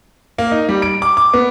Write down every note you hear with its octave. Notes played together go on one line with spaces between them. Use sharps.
A#3
D#4
G3
D7
D6
D6
B3